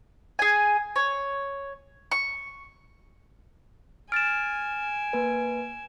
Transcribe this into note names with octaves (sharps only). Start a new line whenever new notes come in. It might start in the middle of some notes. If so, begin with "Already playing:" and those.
G#4 G#5
C#5
C#6
G#5 F6 A6 D7 E7
A#3 B4